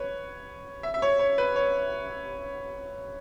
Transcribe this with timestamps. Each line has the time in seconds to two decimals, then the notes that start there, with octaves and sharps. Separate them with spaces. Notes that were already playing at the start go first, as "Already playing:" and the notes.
Already playing: B4 C#5
0.83 E5
0.94 E5
1.02 C#5
1.19 C#5
1.38 B4
1.56 C#5